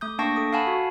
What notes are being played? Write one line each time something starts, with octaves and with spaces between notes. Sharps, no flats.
A3 D#6 G6
A#3 D4 G5 A5 C#6 A#6
A4 D#6
F5 F#5 G#5 A5 B5
F#4